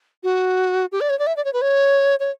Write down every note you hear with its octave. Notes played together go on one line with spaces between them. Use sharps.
F#4
G4
D5
C#5
D5
E5
D5
C#5
B4
C#5
C#5